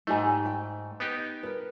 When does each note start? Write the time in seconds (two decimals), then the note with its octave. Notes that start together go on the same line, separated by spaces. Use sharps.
0.07 G#2 A3 D#4 G4 G#5
0.30 G5
0.46 G5
1.00 B3 D#4 G4
1.43 A#4 B4